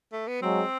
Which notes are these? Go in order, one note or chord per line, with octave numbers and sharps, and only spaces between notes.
A3
B3
F#3 G#3 C4